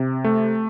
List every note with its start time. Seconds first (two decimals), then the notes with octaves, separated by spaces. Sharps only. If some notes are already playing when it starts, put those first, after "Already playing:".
Already playing: C3
0.24 A3